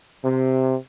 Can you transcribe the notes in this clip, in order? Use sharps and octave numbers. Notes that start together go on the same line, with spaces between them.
C3